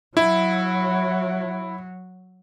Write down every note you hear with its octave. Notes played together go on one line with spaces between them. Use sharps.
F#3 E4